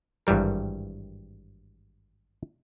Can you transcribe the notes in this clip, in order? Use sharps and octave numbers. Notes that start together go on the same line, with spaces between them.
G#1 G2 E3 G3 A#4